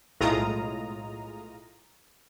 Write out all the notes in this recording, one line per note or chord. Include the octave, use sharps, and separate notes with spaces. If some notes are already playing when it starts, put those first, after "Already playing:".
B1 A2 G#3 F4 A#5 D#6